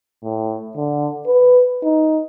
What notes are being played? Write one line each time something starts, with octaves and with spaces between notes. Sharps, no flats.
A2
D3
B4
D#4